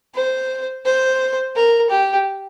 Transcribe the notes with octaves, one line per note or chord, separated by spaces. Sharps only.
C5
C5
A#4
G4